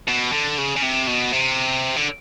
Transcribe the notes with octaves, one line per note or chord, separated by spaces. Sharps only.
B2
D3
C#3
C#3
C3
B2
C3
D3